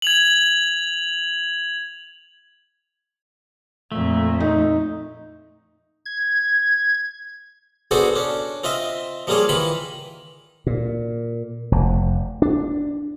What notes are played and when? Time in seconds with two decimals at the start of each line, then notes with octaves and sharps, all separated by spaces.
0.02 G#6 F7 F#7
3.92 F2 A#2 A3
4.40 D#4
6.06 G#6
7.91 B3 D4 F#4 G#4 A4 C5
8.16 C#4 D4
8.64 C4 F4 D#5 E5
9.27 F3 G3 A#3 F4 G#4 C#5
9.49 D#3 E3 F4 B5
10.67 A#2
11.72 F1
12.42 D4